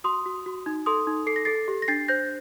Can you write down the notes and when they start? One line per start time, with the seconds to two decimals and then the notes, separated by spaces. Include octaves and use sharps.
0.04 F#4 C6 D#6
0.26 F#4
0.46 F#4
0.66 D#4
0.86 A4 C6 D#6
1.07 D#4
1.27 A4 C7
1.36 A#6
1.45 A4 A6 C7
1.68 G4
1.82 A#6
1.88 D4 A6 C7
2.08 C5 G6 A#6